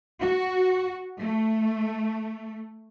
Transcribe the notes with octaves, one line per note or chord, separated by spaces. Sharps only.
F#4
A3